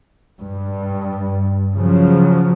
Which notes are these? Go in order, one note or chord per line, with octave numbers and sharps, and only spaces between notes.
G2
C#3 F3 F#3